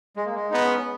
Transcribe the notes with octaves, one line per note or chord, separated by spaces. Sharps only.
G#3
A#3
G#3
B3 D#4
C#4
B3